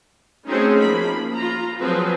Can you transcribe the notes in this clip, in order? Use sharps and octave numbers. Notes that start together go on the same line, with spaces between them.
A3 C4 C#4 D#4 F#4 G#4
F3 A#3 B5
F4 A#5
F3 F#3 C4 F4 G#4 B4